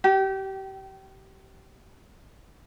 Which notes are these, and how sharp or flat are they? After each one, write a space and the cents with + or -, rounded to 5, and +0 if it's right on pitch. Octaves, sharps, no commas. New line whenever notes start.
G4 -30 G5 -5